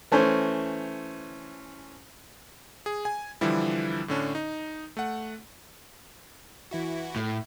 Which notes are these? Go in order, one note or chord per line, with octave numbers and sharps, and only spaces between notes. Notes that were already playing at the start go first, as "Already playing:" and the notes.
E3 A3 C#4 C5
G#4
G#5
D3 E3 F3 G3 E4
A2 D3 C#4 D4
D#4
A3 F#5
E3 E4 F#4
A2